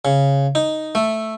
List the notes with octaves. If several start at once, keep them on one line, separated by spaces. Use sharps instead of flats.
C#3
D#4
A3